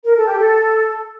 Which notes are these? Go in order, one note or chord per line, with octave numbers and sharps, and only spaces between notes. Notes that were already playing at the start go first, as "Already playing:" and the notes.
A#4
A4
G4
A4